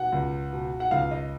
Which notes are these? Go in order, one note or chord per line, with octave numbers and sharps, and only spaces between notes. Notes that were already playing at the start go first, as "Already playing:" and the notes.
Already playing: B2 F#5
C#2
B2
F#5
C#2 F5
D#5